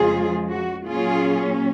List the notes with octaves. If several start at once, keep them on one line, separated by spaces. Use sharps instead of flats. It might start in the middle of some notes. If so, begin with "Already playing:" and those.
Already playing: F2 C#3 F3 G#3 F4 G#4
F#4
A#2 F#3 C#4 F4 G#4